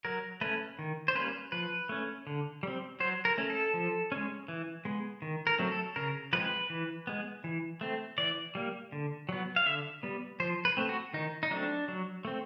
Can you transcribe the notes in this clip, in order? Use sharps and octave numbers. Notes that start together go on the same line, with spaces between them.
F#3 A#4
A3 C#4 B4
D#3
C5
G3 A#3 C#4 B4
F3 B4
A3 C#4
D3
G3 C4
F#3 C5
A#4
A3 C#4
A4
F3
G#3 C#4
E3
G#3 B3
D#3
A#4
F#3 A3 C4
A4
C#3 A#4
F3 G#3 C4 B4
E3
G#3 B3
E3
A3 C4
E3 D5
G3 A#3
D3
F#3 B3
F5
D3 E5
G3 B3
F3 C5
B4
A3 C4
F#4
D#3 D#4
D#4
F#3 A3 C4 D4
F#3
A3 C4